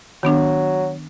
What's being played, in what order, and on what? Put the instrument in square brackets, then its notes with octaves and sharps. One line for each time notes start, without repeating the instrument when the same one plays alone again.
[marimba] D#3 B3 D4 [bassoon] F#3